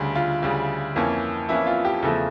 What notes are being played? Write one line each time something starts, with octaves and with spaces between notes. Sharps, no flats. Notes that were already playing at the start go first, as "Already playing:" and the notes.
Already playing: D2 C#3 G3
F4
D2 C#3 G3
F2 E3 A#3 C#4
F2 E3 A#3 C#4 E4
F4
G4
E2 C#3 F3 A3 A4